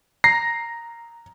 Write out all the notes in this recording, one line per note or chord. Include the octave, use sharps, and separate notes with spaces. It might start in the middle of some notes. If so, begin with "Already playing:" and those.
A#5 A#6 C7